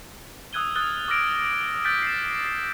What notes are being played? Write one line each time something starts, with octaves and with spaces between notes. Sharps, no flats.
D#6 E6 F#6 G#6 D#7 G7
D#6 F6 F#6 A6 G7
D6 E6 F6 A#6 D7
E6 F#6 G6 A6 B6 D7
C7 E7
C7